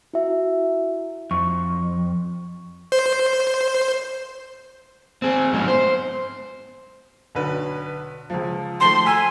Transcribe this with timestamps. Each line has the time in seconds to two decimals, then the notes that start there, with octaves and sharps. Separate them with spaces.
0.13 E4 F#4 E5
1.31 F2 C#6
2.92 C5
5.22 C4 G#4
5.53 G#2 F#3 G#3 B3 C#4
5.68 C5
7.35 B1 D3 B4
8.30 C#2 F3
8.80 D#3 F3 A3 C6
9.05 G#5 A#5 E6 B6